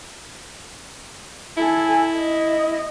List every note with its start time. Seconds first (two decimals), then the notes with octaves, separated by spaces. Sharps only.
1.58 E4 A4 G#5
2.17 D#5